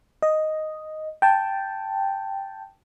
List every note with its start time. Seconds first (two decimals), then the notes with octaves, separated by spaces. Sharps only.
0.22 D#5
1.22 G5 A5